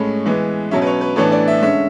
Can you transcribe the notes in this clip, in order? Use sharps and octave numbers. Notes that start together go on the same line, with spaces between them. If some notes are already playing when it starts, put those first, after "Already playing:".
Already playing: A2 G#3 C#4 B5
E3 G#3 B3
B2 F#3 C#4 E5
B4
C#5
B4
A2 E3 B3 D4 C#5
D5
E5
D3 G#3 C#4 E5